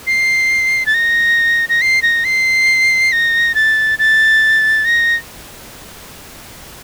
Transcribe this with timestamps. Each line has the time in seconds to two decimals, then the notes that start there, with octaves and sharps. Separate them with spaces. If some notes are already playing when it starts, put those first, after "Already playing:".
0.07 C7
0.86 A6
0.94 A#6
1.69 A#6
1.82 C7
2.02 A#6
2.25 C7
3.12 A#6
3.55 A6
3.99 A6
4.85 A#6